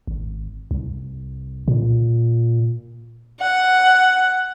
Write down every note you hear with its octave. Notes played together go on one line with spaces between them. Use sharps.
G#1
C2
A#2
F#5